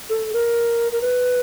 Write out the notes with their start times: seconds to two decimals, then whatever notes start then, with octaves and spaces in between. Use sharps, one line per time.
0.10 A4
0.33 A#4
0.92 A#4
1.02 B4